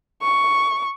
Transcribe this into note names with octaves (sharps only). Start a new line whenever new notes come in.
C#6